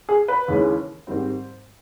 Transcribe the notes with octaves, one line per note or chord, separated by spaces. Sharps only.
G#4
B4
D#2 C#3 E3 G#3 C#4
G#2 D#3 G3 C4 C5